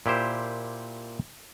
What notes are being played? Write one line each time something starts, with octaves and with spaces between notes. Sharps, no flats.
A#2 E4 G4 C5